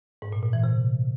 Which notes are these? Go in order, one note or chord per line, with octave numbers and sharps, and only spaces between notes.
G#2
A#2
A#2
E3
C3